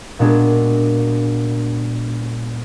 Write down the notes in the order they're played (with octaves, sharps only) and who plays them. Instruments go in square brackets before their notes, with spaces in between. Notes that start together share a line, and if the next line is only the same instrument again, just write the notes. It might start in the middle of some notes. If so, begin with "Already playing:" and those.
[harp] A#2 G#3 B3 D4 F#4 G#4